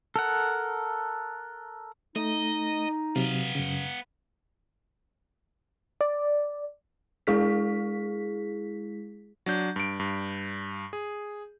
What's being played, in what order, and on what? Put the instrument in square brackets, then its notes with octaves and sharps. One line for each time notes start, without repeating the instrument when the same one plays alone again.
[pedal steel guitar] A4 A#4 F#5
[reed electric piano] A3 [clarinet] D#4 [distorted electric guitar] D#5
[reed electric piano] C3 F#3 [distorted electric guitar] B3 F5
[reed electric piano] F#2 C#3
[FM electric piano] D5
[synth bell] G#3 E4 G#4 B6
[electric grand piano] F#3 D4 G6
G2 D7
G2
G#4